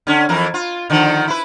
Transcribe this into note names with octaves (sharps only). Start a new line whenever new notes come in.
D3 C#4
F2 E3 A#4
F4
D3 D#3 F3
E4 B4